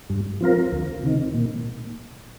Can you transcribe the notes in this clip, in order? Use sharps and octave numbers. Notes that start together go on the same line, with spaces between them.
G2
F3 C4 F4 A#4
D2
C3 D#3
A#2